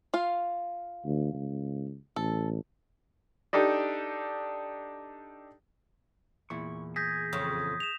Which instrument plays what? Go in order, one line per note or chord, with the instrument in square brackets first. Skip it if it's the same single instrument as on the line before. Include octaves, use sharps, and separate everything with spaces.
[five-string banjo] F4 F5
[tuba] D2
C#2
[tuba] A1 [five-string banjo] A4
[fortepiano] D4 D#4 G4 A4
[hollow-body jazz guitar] E2 A#2 E4 [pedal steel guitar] C#6
[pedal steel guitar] G#4 [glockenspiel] G6 A#6 B6
[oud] F2 C#3 [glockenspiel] D#6
[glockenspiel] E7 F7